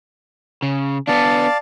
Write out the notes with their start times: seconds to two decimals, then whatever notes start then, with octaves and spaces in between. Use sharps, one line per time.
0.62 C#3
1.07 B3 D4 D5 F5 A5